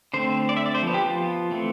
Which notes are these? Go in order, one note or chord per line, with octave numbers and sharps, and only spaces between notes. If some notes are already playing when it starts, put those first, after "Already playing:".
D3 A3 C4 C5
D5
E5
D5
C5
F3 B3
G4
F4
E3 A3 C4